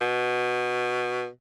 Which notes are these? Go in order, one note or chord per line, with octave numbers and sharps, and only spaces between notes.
B2